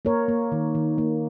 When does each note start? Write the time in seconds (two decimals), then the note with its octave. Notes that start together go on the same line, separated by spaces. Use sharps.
0.05 A#3 A#4 C#5
0.28 A#3
0.52 D#3
0.75 D#3
0.98 A#3